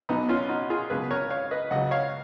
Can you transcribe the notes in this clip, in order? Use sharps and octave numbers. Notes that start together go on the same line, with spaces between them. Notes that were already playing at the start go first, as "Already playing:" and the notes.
B1 B2 F#3 B3 D#4
C#4 F4
D#4 F#4
F4 G#4
C#2 B2 F#3 G#4 B4
A#4 C#5
C#5 F5
B4 D#5
C#2 C#3 F#3 D#5 F#5
C#5 F5